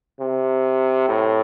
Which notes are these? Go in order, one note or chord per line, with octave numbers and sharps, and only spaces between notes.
C3
A2